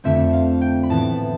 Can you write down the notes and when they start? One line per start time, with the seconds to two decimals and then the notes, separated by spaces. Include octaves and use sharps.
0.04 F2 D3 A3 C4 E5
0.33 F5
0.61 G5
0.83 B5
0.90 A2 E3 B3 A5